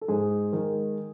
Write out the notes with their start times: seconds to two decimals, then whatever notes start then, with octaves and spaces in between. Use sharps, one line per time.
0.01 A4
0.08 G#2 G#4
0.53 D#3 G#3